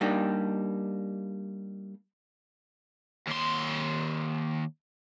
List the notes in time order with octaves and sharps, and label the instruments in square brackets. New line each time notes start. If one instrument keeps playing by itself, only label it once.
[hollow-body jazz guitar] G3 A#3 D4 D#4 G4
[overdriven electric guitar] D#2 C6